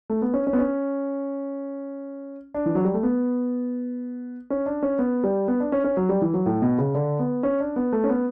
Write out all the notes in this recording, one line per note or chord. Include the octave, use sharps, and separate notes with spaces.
A3
B3
C#4
C#4
B3
C#4
D4
E3
F#3
G3
A3
B3
C#4
D4
C#4
B3
G3
B3
D4
C#4
C#4
F#3
G3
E3
F#3
A2
B2
C#3
D3
B3
C#4
D4
B3
A3
C#4
B3